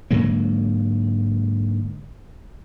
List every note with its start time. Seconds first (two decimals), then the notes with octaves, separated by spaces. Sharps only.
0.11 G#2 D3 F#3 A#3